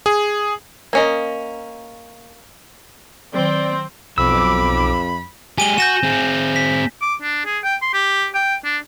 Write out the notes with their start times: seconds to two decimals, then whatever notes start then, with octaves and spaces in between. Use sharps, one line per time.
0.06 G#4
0.93 A#3 C#4 D#5
3.34 D#3 F#3 C4 D5
4.18 B1 F2 B5 D6 E6
5.58 G#3 G4 G#5 D#7 G7
5.78 F#4 G6 A#6 E7
6.03 C4 G#4
6.56 B6
7.02 D6
7.22 D4
7.45 G#4
7.64 G5
7.82 C6
7.94 G4
8.34 G5
8.64 D4